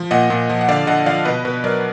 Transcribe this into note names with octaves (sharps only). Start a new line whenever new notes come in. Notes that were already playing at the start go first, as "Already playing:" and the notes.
Already playing: F3
A#2 D#5 F#5
A#2
F3
F#5
D3 D5 F5
D3 D#5 F#5
F3 D5 F5
B2 B4 D#5
B2 B4
F#3 A#4 D5